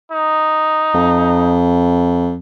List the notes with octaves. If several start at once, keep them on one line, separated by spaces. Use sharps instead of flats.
D#4
F2